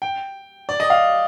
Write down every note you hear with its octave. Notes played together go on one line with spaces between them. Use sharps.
G5
D5
D#5
F5